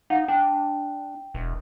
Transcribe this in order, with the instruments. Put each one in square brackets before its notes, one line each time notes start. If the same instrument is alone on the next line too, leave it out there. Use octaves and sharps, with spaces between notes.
[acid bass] D#4 [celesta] F5 F#5
[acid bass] D4 [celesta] G5
[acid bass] E1